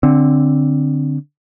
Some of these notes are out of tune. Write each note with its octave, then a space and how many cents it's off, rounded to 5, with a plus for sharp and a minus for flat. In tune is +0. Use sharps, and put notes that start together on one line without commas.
D3 +0 C4 +0